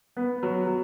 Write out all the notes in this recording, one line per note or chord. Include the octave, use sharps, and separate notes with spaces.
B3
F#3
F#3